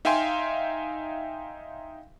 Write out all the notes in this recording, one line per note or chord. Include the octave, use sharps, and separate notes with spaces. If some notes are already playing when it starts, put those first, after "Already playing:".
D#4 E5 F5 G5 G#5 C6